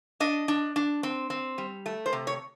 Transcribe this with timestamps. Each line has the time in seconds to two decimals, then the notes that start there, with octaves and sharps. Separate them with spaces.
0.20 D4 D#5
0.48 D4
0.76 D4
1.03 C4
1.30 C4
1.58 G3
1.86 A3
2.06 C5
2.13 C3
2.27 C#5